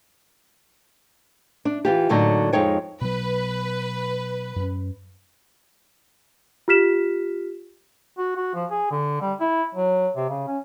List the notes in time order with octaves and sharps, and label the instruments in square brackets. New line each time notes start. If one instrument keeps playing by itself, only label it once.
[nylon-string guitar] D4
E3 F4 G4
A2 D3 F#3 A#3 D#4
F2 G#3 D#4 C#5 G5
[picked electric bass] B2 F#3 [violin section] B4
[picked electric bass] F#2 C#4
[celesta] F4 G4 F6 B6 E7
[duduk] F#4
F#4
F3
G#4
D3
G3
E4
F#3
C3
C#3
C#4